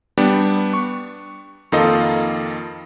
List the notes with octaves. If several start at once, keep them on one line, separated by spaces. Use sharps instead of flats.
G3 B3 D4 G4
C#6
F2 D#3 A#3 F4 A4 D#5